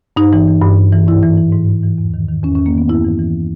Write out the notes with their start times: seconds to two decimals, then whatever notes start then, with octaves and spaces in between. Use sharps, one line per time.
0.16 G2 D#4
0.33 E3
0.48 E3
0.62 G2
0.77 G2
0.92 E3
1.07 G#2 E4
1.23 E3
1.37 E3
1.53 G#2
1.68 G#2
1.83 E3
1.98 E2
2.14 D#3
2.29 D#3
2.43 E2 C#4
2.55 E2 C#4
2.66 A#3
2.73 D#3 B3
2.89 G2 E4
3.04 E3
3.19 E3